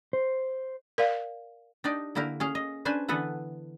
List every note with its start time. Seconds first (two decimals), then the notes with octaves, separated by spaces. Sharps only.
0.13 C5
0.98 A#4 D5 F5
1.84 D4 D#4 G4 D5 D#5
2.15 D3 A#3 E4 G4 A#4
2.40 C#4 G#4 F5
2.55 D#5
2.85 C#4 D4 B4 C5 G#5
3.08 D3 E3 B3 A4 B4 F#5